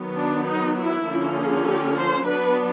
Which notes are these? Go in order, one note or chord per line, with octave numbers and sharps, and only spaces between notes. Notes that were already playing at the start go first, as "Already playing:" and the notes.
Already playing: D#3 F#3 B3
D4
D#4
E4
D3 F3 A#3 C#4
G#4
G4
C5
F#3 B3 D4 B4